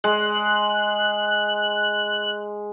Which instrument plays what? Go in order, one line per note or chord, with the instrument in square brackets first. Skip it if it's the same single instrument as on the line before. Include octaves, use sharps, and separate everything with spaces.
[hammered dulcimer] G#3 [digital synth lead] F#6